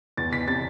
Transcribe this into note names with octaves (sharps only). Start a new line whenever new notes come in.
E2 A6
E2 B6
C3 A6